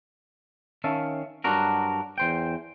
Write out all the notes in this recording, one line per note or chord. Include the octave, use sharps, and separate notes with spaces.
D#3 C#4 E5 F5 A5
G2 F#3 D4 F#4 A#4
E2 C5 G5